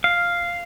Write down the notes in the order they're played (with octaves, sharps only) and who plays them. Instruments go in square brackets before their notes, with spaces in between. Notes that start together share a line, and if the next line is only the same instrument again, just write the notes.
[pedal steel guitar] F5